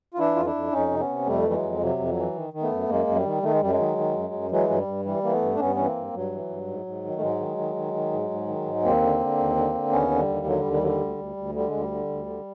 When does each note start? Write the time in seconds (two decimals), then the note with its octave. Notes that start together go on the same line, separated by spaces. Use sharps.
0.14 F4
0.19 E3 D4 E4
0.36 F2 F4
0.45 D4 E4
0.55 F2
0.73 F2 C#4 D#4
0.91 C3
1.00 B3 C#4
1.09 C3
1.27 F2 G3 A3
1.45 E3 G3
1.54 F#3 G#3
1.63 F2
1.81 C3 F#3
1.99 F2
2.09 F#3
2.17 E3
2.35 D#3
2.54 D#3
2.62 A3 B3
2.71 F#2
2.89 F#2 G#3 A#3
3.07 F#2
3.16 G3
3.25 D#3
3.43 D#3 A3
3.52 G#3
3.61 F#2 G3
3.71 F#3 G#3
3.79 D#3
3.98 D#3
4.15 F#2
4.34 F#2
4.51 E3 F#3 G#3
4.69 G2 F#3
4.78 G3
4.87 G2
5.05 E3 G3
5.23 E3 A#3
5.32 A3 B3
5.42 G2
5.55 D4
5.60 G2 B3 C#4
5.76 E3 C#4
5.86 A#3 C4
5.96 G2
6.13 G2 F#3
6.32 E3
6.50 G2
6.68 G#2
6.86 G#2
7.04 D#3
7.16 A3
7.21 G#2 F#3 G#3
7.40 D#3
7.58 D#3
7.76 D#3
7.94 D#3
8.12 G#2
8.30 G#2
8.47 D#3
8.65 G#2
8.84 D#2 A#3 C4
9.03 D3
9.20 D3
9.38 D#2
9.56 D3
9.74 D3
9.92 D#2 B3 C#4
10.11 D3
10.19 G3
10.28 D#2
10.46 D3 F#3
10.60 G3
10.64 D#2
10.73 G3
10.82 D3 F#3
10.87 G3
11.01 D2
11.18 D2
11.37 D2
11.54 D3 G3
11.68 D2 G#3
11.81 G3
11.91 D3
12.09 D2
12.27 D3